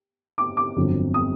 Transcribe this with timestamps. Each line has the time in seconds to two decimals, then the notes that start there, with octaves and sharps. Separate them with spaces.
0.38 D6
0.57 D6
0.76 G1 F2 D3 F#3
1.14 D#6